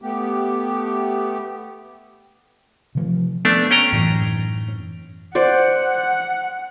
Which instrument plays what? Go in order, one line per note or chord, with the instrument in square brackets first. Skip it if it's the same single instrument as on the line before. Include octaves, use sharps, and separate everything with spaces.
[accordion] A3 B3 G4
[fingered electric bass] C3 F3
[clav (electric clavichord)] A3 D4 [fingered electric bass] B3
[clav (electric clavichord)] C#4 G5 A#5
[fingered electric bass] F#2 A2 E3
[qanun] C5 D5 [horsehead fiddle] F#5